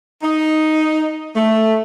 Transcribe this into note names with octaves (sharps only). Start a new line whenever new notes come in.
D#4
A3